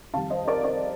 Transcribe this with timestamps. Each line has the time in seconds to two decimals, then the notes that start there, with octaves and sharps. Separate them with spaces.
0.13 F2 D#3 G3 F5 A5
0.30 C5 D#5
0.47 A#4 D5
0.64 A#4 D5